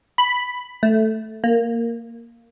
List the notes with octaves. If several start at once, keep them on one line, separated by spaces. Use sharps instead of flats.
B5
A3
A#3